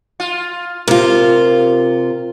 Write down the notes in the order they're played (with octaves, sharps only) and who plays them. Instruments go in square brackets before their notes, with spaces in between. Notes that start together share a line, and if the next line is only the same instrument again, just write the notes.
[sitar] F4
[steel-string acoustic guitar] C3 F4 [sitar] A#4